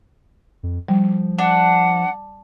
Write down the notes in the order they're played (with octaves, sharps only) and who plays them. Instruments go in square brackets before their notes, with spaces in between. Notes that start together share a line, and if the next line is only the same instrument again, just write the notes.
[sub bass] F2
[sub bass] F3 [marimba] G3
[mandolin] D4 [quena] F#5